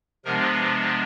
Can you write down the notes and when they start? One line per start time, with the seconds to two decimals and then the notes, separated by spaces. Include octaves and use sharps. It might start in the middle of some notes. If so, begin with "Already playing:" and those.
0.25 C3 F3 G#3 B3 D4 A#4
0.53 B4